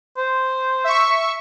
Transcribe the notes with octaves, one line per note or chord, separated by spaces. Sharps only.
C5
E5 C#6